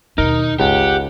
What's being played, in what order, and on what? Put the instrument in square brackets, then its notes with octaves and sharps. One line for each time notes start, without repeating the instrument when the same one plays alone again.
[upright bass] D#2 B2 [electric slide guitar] D#4 [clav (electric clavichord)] A#4
[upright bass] G1 [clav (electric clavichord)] C#2 [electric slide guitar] G4 [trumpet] F#5